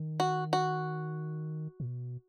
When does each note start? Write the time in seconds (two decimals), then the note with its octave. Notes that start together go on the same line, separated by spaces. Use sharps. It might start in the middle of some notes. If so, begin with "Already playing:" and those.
Already playing: D#3
0.20 F#4
0.53 F#4
1.80 A#2
1.87 B2